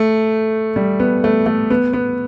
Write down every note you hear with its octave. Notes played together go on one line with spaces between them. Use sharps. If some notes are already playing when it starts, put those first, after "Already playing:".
Already playing: A3
G3
B3
A3
A3
B3
B3